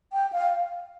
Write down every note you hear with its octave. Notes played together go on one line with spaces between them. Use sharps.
G5
F5